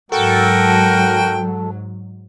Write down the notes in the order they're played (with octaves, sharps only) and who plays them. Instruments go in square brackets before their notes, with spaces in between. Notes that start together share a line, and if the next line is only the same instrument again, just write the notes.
[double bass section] G#2 F#3 [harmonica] F#4 A#4 G5 [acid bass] A4